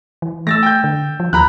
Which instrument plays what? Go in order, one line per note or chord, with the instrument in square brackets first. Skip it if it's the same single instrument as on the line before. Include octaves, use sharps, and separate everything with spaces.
[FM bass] E3
[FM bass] A3 [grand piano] E6 A6 A#6
[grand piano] G5 G6
[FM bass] D3
F3
[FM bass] D#2 [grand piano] A#5 B5 F#6